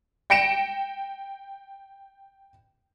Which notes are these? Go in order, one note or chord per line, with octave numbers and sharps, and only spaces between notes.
G5 A#6 C#7 D7 E7